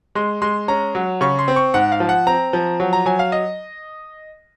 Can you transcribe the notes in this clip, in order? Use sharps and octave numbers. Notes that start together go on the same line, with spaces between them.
G#3 C6
G#3 C6
C#4 A#5
F#3
C#3 C#6
C6
C4
C#6
G#2 F#5
F5
F3
F#5
C4 A#5
F3
F#3
A#5
F#3 G#5
F5
D#5